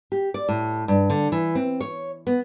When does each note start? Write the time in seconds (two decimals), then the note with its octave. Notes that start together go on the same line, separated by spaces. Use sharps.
0.12 G4
0.34 D5
0.49 A2
0.88 G2
1.10 D3
1.32 E3
1.55 C4
1.81 C#5
2.27 B3